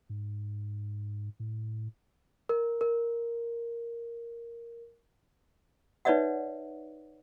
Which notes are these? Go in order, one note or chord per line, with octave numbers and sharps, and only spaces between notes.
G#2
A2
A#4
A#4
D#4 B4 C#5 D5 E5 F#5